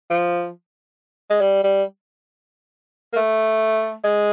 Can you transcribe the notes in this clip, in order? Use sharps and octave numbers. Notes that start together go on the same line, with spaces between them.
F3
G#3
G3
G3
A#3
A3
G#3